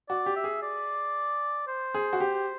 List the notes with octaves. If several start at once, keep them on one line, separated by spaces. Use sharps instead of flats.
F#4 D5
G4
E5
G#4
D5
C5
G#4
F#4
G4